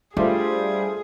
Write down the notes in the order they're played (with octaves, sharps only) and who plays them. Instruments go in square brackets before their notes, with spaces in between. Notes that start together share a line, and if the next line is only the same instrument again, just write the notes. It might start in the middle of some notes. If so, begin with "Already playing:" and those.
[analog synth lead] G3 [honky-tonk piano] A3 F4 C5 [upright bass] D4 [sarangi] G#4